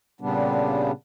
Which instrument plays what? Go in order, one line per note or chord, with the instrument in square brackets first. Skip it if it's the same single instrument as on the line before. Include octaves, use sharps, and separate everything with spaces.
[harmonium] A#2 C#3 G3 B3 D4